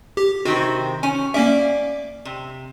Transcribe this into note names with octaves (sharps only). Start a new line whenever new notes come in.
G4
C3 D#3 C4 F#4
C#4 G#5
A#3 C#4 D5 E5
C3